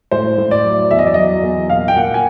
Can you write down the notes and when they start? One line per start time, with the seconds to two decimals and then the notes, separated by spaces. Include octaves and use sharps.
0.11 A2 C5
0.38 A2
0.51 D5
0.64 F#3
0.91 E2 E5
0.99 D#5
1.06 D5
1.14 F#3 D#5
1.43 E2
1.70 A#2 F5
1.88 G5
1.96 A#2 F#5
2.14 G#5